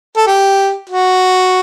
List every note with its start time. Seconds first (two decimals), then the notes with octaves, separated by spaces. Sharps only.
0.17 A4
0.27 G4
0.89 F#4